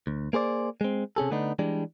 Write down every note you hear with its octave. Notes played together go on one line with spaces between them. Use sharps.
D2
A#3 G#4 C5 D5
G#3 C4
C3 C#4 G#4 A4
D3 A3 B3 D4 D#4
E3 G3 G#3 D4